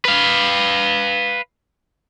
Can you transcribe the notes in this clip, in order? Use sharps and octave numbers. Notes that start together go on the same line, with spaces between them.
B4 F5